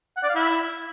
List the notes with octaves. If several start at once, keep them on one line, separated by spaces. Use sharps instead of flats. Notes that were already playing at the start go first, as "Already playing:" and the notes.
F#5
D5
F5
E4